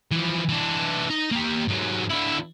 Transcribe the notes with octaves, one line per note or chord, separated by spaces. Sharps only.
E3 F3
E3 D4
D#4 A#5
A#3 G4
G#2 F#3
D3 E4